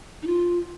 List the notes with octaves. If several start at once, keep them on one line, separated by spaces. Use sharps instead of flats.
D#4
F4